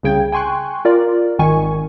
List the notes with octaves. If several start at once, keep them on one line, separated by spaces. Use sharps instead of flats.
C2 C#3 G5 G#6
G5 G#5 C6 C#6 F#6
F4 A#4 D5
G#1 D#3 G#5 C#6